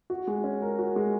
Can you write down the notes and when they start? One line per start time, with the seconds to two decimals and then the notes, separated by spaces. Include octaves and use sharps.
0.10 F#4
0.28 G#3
0.44 C#4
0.62 A#4
0.79 F#4
0.96 G#3